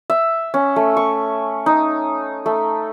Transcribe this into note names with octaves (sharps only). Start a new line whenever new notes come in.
E5
C#4
A3
C#6
D#4
A3